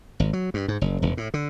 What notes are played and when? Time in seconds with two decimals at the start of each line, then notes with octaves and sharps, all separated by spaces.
0.20 G#1
0.33 F#3
0.54 G2
0.68 G#2
0.81 F#1
1.02 E1
1.17 A2
1.34 D3